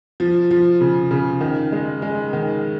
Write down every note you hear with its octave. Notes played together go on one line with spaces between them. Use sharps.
F3
F3
C#3
C#3
D#3
G#3
G#3
D#3